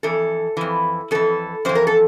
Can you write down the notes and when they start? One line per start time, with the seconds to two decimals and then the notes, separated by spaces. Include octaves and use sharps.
0.03 F2 E3 A4
0.57 F2 E3
1.11 F2 E3 A4
1.65 F2 E3 C5
1.75 A#4
1.87 A4